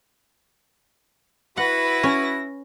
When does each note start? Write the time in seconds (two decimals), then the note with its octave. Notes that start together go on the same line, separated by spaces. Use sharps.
1.57 E4 F#4 B4 F#5 A#6
2.03 C#4